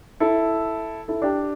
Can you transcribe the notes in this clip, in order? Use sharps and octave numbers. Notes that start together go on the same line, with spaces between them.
E4 A4
E4 A4
D4 G4